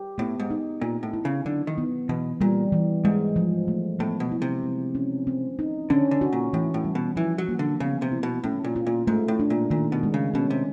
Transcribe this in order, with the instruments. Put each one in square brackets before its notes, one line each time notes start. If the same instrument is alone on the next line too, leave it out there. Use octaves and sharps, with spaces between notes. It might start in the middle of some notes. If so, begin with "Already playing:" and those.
Already playing: [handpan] G4
[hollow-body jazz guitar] A2 [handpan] B3
[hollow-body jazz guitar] G#2
[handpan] D#4
[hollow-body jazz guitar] A#2 [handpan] C4
[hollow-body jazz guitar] A2
[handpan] E4
[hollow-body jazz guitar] C#3
[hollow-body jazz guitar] D3 [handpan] F#3
[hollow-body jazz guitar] D#3
[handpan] B3
[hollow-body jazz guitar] B2 [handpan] E3
[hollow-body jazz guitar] A#2 [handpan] G3
[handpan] E3
[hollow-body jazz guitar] G#2 [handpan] G#3
[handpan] F3
A3
[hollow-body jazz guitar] A2 [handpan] B3
[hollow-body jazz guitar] B2
[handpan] E4
[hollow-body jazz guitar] C3
[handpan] G#3
C#4
C4
D#4
[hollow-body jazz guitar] D3 [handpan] C#4
[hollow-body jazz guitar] D3
[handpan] F#4
[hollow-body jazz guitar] A#2
[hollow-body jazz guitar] A2 [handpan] E3
[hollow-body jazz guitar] A2
[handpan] G3
[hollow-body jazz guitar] B2
[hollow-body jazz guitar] E3 [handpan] F3
[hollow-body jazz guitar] F#3
[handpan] A#3
[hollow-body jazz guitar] D3
[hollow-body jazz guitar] C#3 [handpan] B3
[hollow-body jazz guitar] C3
[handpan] E4
[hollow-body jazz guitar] B2
[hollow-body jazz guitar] A2 [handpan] C#4
[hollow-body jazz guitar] A#2
[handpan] F4
[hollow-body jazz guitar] A#2
[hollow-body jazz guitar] G#2 [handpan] A3
[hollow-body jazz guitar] A2
[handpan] D4
[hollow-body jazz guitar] A#2
[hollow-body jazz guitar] A#2 [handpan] D#3
[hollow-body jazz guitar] B2
[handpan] G#3
[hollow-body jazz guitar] C#3
[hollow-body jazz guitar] B2 [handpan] C#4
[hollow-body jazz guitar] C3